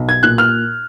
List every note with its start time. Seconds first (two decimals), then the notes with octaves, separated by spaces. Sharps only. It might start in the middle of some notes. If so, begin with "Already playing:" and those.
Already playing: B1
0.09 G#6
0.23 A#2 F#6
0.38 F6